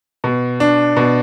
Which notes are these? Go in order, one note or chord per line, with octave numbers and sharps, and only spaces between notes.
B2
D4
B2